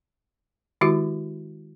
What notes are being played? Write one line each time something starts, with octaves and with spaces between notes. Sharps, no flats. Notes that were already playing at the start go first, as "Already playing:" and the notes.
D#3 G#3 E4 F#4 G4